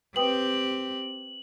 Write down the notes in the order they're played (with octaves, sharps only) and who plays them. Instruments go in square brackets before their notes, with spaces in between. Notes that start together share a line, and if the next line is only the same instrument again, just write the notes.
[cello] C4 G4 [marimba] B4 G5 D#6 [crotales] F#7